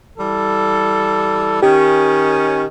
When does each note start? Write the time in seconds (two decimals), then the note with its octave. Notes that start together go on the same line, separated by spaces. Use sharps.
0.18 E3 G3 A4
1.62 D#3 C#4 G4